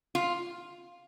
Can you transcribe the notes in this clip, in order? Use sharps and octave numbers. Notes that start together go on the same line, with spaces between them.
F4